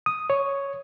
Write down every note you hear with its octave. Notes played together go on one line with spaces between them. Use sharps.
D#6
C#5